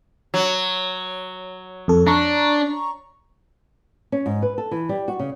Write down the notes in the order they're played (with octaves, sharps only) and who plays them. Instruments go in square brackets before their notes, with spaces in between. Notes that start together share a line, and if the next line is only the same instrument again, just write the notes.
[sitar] F#3
[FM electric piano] F2 A4
[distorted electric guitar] D4 [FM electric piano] A#5 C#6
[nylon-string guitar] C#4
G#2
B4
A4
E3
G3
F#4
C#3